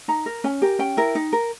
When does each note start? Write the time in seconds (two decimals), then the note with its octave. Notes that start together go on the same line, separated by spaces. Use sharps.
0.08 D#4 A#5
0.26 A#4
0.44 C#4 G#5
0.62 G4 A#4
0.79 C#4 G5
0.97 E4 A#4
1.15 D#4
1.33 A#4